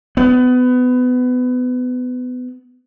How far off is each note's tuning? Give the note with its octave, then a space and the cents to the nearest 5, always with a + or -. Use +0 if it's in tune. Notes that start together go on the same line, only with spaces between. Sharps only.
B3 +25